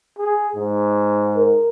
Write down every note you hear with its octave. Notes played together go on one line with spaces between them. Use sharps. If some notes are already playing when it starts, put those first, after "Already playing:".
G#4
G#2
A#4